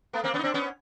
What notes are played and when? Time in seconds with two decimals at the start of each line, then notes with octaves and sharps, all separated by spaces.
0.13 A3 B3
0.24 A#3 C4
0.34 B3 C#4
0.39 D#4
0.43 C4 D4
0.54 B3 C#4